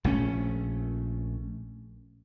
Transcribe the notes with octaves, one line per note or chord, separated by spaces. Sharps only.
A#1 A3 C#4